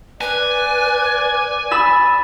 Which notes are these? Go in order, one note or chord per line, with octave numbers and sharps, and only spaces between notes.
B4 D5 G#5
B5 E6 A6